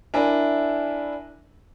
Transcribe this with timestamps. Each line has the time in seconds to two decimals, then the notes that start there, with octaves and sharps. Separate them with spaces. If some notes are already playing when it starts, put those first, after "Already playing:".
0.14 D4 E4 A#4 E5 G#5